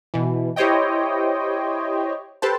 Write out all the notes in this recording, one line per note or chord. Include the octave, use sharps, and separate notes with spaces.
B2 E3
E4 G4 C5 C#5 D#5 G5
G4 A4 B4 C5 A5